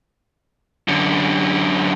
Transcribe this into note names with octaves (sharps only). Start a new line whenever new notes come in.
F#2 D3